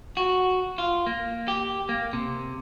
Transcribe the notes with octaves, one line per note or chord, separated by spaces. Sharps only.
F#4
F4
A#3
G4
A#3
C3